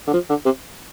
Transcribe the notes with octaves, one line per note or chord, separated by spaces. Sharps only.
D3
F3
D3
C3